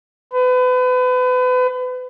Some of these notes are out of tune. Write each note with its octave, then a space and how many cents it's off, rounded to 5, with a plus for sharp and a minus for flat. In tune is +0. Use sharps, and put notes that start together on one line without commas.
B4 +35